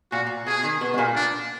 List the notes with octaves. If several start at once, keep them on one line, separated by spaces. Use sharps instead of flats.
A#2 F#4
A#2
B2 G#4
D#3
B2 B3
G#3
A#2 A#3
D4